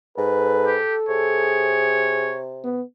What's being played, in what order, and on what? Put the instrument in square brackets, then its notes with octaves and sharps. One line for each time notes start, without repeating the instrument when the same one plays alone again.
[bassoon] G#2 [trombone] A4 [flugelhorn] B4
[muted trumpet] G4
[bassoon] C3 [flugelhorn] G#4 [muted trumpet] C#5
[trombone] B3